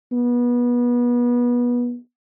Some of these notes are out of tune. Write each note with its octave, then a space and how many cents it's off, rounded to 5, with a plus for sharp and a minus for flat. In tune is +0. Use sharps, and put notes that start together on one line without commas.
B3 -25